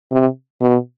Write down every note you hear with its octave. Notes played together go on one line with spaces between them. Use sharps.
C3
B2